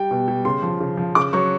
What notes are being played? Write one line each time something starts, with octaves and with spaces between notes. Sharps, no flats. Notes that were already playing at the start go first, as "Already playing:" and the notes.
Already playing: G3 G5
B2
G3
C#3 C6
F3
C#3
F3
C#3 D6
F#3 C#6